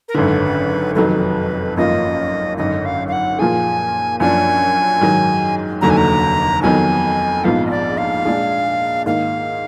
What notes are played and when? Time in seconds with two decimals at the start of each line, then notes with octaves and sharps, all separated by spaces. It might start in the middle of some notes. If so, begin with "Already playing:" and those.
0.08 A#4
0.14 G#1 F#2 D3 B4
0.95 F1 F2 D#3 F#3 B4
1.77 G#1 F#2 F3 A#3 F4 D#5
2.58 G#1 F#2 D3 D#5
2.85 F5
3.08 F5
3.12 F#5
3.38 A#2 F3 A#3 F4 G#4 G#5
4.20 F#2 F3 A#3 D4 G#5
5.01 G#2 D#3 F#3
5.81 F1 D#2 D3 F#3 A#5
5.90 G#5
5.97 A#5
6.62 F2 D#3 F#3 B3 G#5
7.44 A#1 G#2 F3 B3 F5
7.66 D#5
7.70 D5
7.98 F5
8.25 A#2 G#3 D4 G#4
9.06 G#2 D#3 A#3 F5